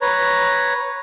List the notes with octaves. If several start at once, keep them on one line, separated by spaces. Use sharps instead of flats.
B4 C#5 A#5